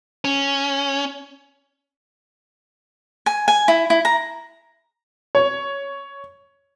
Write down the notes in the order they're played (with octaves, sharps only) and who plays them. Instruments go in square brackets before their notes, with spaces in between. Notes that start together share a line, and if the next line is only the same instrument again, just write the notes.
[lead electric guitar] C#4
[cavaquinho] G#5
G#5
E4
E4
A#5
[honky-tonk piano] C#5